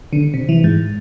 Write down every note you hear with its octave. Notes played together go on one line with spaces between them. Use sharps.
D3
C3
E3
G#2